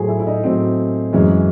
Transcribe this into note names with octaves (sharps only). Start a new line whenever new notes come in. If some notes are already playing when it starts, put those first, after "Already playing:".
Already playing: A2 F#3 A3 G#4 C5
E4
E4
D#4
A2 F#3 A3 C4
F#2 E3 G#3 C#4